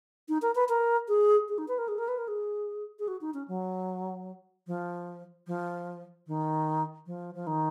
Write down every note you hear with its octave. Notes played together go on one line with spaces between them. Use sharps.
D#4
A#4
B4
A#4
G#4
G#4
D#4
B4
A#4
G#4
A#4
B4
A#4
G#4
G#4
F#4
D#4
C#4
F#3
F3
F3
D#3
F3
F3
D#3